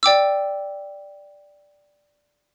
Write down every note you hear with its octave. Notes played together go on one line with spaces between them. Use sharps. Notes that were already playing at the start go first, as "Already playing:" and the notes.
D5 G5 D6 E6